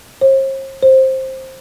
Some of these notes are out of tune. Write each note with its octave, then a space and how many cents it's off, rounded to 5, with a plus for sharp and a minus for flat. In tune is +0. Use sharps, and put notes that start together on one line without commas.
C5 +45
C5 +10